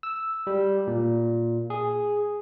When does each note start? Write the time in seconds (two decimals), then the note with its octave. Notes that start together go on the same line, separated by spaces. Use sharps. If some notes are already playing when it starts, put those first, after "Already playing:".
0.03 E6
0.47 G3
0.87 A#2
1.70 G#4